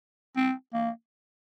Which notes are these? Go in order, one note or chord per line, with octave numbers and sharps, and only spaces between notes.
C4
A#3